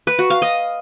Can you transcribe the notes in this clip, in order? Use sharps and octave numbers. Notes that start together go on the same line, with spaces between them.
B4
F#4
F5
D#5